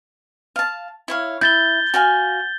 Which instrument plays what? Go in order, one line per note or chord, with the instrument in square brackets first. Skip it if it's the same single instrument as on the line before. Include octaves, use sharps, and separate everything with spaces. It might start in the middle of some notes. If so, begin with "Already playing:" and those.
[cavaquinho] F5 A5
E4 C#5 F5
[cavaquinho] E4 [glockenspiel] G6 A6 G7
[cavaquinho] F#4 F5 G#5